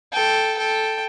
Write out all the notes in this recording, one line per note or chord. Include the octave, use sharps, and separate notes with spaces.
A4 G5
A4 G5